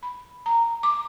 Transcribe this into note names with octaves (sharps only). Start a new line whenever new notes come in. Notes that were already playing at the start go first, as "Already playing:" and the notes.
B5
A#5
D6